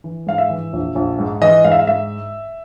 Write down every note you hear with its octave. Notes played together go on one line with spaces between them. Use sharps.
E3
G#2 F5
E5
E3
A#1
A#1
G#2
E3 D#5
G#2 F5
E5
F5
G#2 E5